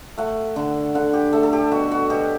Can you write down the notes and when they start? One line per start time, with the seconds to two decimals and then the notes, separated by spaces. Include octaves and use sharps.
0.18 A3 F#5
0.56 D3
0.95 D3 F#5
1.13 G4
1.33 A3 A4
1.43 A4
1.53 G4
1.72 B2 F#4
1.91 F#4
2.10 B2 G4